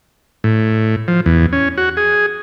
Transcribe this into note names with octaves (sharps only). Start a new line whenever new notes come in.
A2
F3
E2
C#4
F#4
G#4